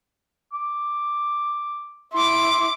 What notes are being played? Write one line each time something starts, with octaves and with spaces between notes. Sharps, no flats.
D6
E4 C6 D6